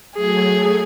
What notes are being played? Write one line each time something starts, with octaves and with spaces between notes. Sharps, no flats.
F#3 A3 G#4 G#6